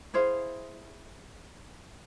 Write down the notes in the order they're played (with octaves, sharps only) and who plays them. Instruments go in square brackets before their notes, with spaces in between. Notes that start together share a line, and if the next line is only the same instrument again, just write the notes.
[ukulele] E4 G#4 C5 F5